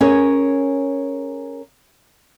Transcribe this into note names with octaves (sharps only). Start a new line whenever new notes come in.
C#4 G#4 A#4 C#5